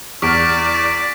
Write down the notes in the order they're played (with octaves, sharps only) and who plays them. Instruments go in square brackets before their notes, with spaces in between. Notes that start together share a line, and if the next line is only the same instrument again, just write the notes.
[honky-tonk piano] E2 F6 [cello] D5 [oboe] C#6 [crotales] D6 B6 D7